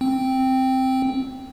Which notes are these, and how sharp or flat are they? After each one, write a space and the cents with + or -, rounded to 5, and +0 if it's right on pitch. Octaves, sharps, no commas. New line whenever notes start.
C4 +0 G5 +0